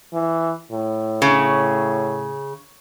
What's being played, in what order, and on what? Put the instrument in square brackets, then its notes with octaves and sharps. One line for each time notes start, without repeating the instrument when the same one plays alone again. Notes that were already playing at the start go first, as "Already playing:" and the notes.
[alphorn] E3
A2
[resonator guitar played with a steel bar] C#3